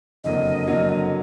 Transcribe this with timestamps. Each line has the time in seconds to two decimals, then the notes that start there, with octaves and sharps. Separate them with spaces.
0.24 F#1 F2 D3 F#3 A#3 D#5
0.67 D3 F#3 A#3